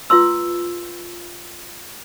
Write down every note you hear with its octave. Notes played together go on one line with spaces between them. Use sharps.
F4 B4 C6 E6